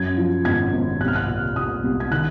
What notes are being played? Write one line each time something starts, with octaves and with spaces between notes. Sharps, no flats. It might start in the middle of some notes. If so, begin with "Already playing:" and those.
Already playing: F#2 G#6
F3
G#1 G#6
G#1
C2 F#6
F6
F#6
A#2
A#2 D#6
C2
G#6
D#3 F#6